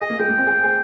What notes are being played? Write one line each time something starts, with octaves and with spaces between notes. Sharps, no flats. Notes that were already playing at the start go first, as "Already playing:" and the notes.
G#4 D#5
A#3
G#3 G5
A#3
C4
G#4
G#4